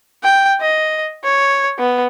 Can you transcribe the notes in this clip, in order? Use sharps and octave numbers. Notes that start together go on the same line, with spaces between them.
G5
D#5
C#5
B3